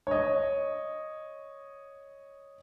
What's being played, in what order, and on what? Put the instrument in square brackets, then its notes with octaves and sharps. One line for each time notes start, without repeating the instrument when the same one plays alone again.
[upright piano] C#5 D#5